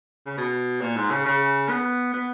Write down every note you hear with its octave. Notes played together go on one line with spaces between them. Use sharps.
C#3
B2
A#2
G#2
C#3
C#3
B3
B3